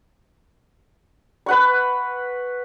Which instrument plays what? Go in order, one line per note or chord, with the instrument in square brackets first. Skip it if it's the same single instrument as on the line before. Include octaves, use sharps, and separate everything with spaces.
[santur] B4 F#5 C#6